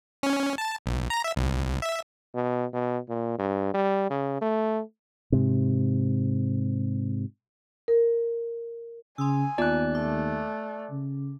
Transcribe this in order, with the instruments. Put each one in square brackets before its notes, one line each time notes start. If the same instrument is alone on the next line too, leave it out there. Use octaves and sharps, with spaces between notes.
[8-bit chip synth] C#4
A5
B1
A#5
E5
C2
E5
[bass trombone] B2
B2
A#2
G2
G3
C#3
A3
[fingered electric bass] G#2 C3
[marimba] A#4
[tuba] C#3 [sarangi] G#5 [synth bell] C6 D#6 E6
[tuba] D#2 [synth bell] B3 F4 A5 [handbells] D5 F#6
[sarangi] A3 [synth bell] D6
[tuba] C#3